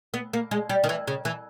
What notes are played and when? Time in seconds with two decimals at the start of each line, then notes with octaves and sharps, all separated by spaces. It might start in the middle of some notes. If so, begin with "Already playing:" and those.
0.14 B3
0.33 A#3
0.51 G#3
0.69 G3
0.84 D#3
0.89 E3
1.07 C#3
1.25 E3